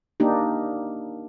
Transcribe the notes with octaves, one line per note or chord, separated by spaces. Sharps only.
A#3 D4 D#4 G4